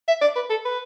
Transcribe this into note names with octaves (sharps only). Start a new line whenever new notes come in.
E5
D5
B4
A4
B4